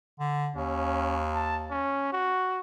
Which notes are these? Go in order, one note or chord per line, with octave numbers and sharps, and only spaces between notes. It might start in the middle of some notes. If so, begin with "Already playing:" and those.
D3
D#2 C#4
A5
C#4
F#4